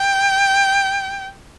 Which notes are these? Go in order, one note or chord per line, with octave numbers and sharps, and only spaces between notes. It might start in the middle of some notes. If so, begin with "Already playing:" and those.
Already playing: G5